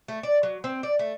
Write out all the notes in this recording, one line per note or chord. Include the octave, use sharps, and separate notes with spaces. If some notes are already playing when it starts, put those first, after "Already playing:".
A3
D5
F#3
C4
D5
A3